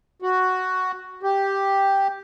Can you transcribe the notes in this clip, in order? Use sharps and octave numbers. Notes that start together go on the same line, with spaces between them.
F#4
G4